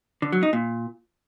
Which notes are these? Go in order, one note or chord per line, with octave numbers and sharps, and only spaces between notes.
D3
F#3
D#4
A#2